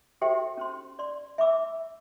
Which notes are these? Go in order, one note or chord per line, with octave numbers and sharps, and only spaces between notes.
F#4 G4 A4 C5 E5 G5
C#4 C5 C6
D5 C6
E5 B5 D6 E6